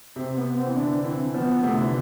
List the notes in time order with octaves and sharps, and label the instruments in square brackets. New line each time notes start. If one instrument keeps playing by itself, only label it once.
[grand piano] C3 [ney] C4
[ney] B3
C4
[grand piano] E3
[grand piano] D3 [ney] D4
[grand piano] E3 [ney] C4
[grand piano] F3 [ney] B3
[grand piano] C3 [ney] A3
[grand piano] D3
E3